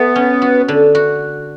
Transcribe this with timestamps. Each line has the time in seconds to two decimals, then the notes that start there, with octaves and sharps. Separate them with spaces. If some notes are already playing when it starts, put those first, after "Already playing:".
Already playing: A3 B3
0.16 C#4
0.42 F#4
0.68 D3
0.95 F#4